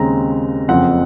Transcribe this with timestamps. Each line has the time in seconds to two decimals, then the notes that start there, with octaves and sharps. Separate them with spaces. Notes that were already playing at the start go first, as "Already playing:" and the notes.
Already playing: D#2 C#3 G#3 C4 A#5
0.68 F#1 F2 C#3 F3 C4 F#5